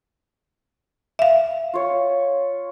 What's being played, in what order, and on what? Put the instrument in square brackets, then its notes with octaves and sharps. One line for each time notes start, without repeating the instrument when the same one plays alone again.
[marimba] E5 F5
[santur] F4 C#5